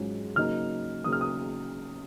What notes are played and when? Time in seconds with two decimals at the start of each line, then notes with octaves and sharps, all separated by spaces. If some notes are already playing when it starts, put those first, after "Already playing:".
Already playing: G#2 F#3 C#4 F4
0.36 C#3 F#3 A#3 D#4 F6
1.04 C#3 F#3 A#3 D#4 D#6
1.12 F6
1.21 D#6